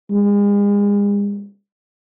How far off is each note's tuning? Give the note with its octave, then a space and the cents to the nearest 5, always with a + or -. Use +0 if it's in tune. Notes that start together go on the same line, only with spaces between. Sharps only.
G#3 -40